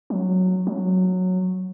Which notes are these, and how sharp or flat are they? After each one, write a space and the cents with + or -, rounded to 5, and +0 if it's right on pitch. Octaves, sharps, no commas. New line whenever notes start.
F#3 -10
F#3 -10